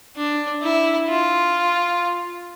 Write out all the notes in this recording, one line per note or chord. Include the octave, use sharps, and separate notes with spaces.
D4
E4
F4